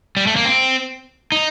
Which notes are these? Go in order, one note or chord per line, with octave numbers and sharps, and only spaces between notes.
G3
A3
A#3
C4
D#4